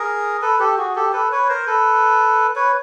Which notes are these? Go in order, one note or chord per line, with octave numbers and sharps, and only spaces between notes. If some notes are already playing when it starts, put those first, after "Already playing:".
Already playing: G#4 A#4
A4 B4
G4 A4
F#4 G#4
G4 A4
A4 B4
B4 C#5
A#4 C5
A4 B4
B4 C#5